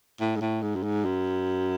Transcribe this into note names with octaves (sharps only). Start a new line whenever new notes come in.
A2
G#2
A2
G#2
F#2
G#2
F#2